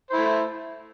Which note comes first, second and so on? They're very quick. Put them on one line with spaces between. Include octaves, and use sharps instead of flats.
C5 E4 A3